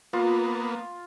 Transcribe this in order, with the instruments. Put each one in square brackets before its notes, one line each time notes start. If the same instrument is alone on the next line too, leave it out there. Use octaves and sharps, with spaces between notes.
[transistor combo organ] A#3 B3 [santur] F4